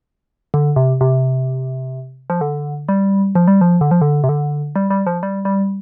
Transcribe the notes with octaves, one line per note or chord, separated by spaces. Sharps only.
D3
C3
C3
F3
D3
G3
F3
G3
F3
D3
F3
D3
C3
D3
G3
G3
F3
G3
G3